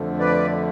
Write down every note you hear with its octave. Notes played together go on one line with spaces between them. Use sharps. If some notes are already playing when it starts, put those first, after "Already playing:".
Already playing: F2 D3 F3 A3
B4 D5